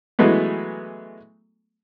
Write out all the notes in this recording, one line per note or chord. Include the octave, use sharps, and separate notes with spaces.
E3 F#3 G#3 A3 B3